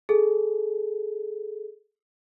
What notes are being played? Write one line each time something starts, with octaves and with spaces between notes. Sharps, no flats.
G#4 A4